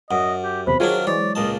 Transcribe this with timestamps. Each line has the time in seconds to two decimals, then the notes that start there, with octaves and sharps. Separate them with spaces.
0.11 F#2 D#5 F#5
0.43 G4
0.67 E2 C3 C5 B5
0.80 D#3 F#3 D4 F4 G#4 C#5 F5
1.07 E3 F#3 G#3 C#5 D5
1.35 C#2 A#2 D#5 A5